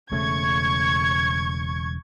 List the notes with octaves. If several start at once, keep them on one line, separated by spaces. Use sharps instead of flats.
E1 C#3 A3 C#6 G#6